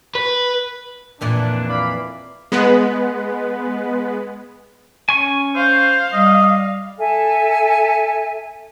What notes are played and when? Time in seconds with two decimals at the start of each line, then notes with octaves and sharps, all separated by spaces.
0.15 B4
1.21 F2 A#2 E3 D4
1.69 F5 B5 D6
2.52 G#3 B3 B4
5.09 C#4 G#5 C#6
5.56 C5 F5
6.13 G3 D#5
6.99 A4 E5 G#5